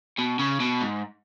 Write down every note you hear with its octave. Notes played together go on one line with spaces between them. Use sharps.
B2
C#3
B2
G#2